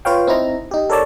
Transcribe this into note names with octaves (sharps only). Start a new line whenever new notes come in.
F4 B4 C#5 F5 G5
C4 D#4 E4 A#5
D#4 G4
A4 A#4 C#5 D5 A5